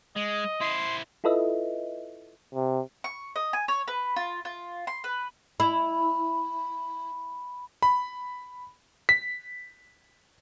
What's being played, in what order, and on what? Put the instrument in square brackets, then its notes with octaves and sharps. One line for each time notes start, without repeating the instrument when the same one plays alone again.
[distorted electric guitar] G#3 [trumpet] D#5
[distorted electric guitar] E4 C5 [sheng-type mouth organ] C6
[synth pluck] E4 F4 A4 B4 D#5 E5
[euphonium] C3
[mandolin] C#6
D#5
G#5
C#5
B4
F4
F4
C6
B4
[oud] E4 [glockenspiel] B5
[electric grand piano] B5
B6